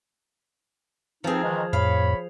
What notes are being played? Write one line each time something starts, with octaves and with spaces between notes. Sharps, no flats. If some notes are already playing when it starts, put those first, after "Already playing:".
F3 C4 D#4 G#4 B4
D#3 E3 G#3 D#5 A#5
F2 A2 C#5 F5 B5